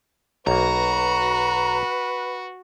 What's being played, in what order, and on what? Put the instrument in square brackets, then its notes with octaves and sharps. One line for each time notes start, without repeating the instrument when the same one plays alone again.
[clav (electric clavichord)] B1 A#3 [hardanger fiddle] F#4 [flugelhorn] B4 [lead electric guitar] A#5